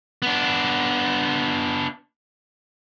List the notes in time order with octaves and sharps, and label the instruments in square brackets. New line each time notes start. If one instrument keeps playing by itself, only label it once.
[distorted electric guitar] B3 D4